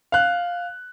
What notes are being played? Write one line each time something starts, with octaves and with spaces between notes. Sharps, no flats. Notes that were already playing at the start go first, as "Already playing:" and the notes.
F5 F#6